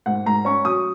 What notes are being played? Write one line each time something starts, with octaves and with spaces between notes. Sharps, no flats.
G#2 F#5
G#2 A#5
C#4 C#6
F#3 D#6